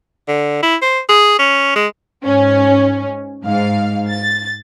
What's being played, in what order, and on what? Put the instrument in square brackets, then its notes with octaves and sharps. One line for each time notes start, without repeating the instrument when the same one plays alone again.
[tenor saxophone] D3
E4
C5
G#4
C#4
G#3
[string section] G#2 C#4
G#2 F5
A6